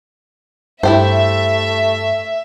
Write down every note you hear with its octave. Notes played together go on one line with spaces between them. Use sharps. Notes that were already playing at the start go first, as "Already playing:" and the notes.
G2 A3 E4 G4 C5 E5